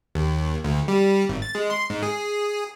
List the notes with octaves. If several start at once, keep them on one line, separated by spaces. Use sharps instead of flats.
D#2
D2
G3
G#1
A6
G#3
C6
G#2
G#4